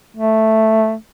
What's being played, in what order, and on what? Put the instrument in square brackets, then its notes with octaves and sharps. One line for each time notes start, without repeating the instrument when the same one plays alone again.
[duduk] A3